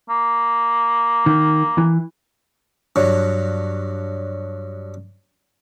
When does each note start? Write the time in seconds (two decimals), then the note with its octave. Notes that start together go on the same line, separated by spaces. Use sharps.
0.09 A#3
1.26 D#3
1.78 E3
2.96 G2 F#3